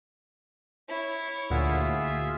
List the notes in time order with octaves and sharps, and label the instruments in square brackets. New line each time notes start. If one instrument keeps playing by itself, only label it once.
[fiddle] E4 C#5
[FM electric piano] D2 A#2 F#4 [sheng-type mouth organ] F4 G#4 E5